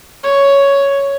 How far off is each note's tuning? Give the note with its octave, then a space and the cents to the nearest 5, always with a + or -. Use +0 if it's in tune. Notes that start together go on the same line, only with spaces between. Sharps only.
C#5 +5